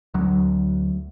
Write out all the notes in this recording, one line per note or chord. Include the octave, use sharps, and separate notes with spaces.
D2 F#3